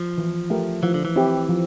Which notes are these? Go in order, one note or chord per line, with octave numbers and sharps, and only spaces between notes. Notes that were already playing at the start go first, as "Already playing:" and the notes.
Already playing: F3
E3
A3 E4 G4 A#4
E3 F3
D3
E3
C4 E4 G4
F3